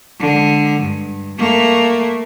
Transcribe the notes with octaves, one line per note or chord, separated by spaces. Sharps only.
D3 G#3
G2
A3 A#3